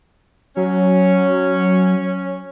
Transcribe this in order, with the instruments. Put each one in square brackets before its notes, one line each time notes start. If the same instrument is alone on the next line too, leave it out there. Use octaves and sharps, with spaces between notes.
[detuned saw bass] F#3 [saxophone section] C#4